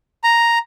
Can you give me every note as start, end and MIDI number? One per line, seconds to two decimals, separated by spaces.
0.24 0.58 82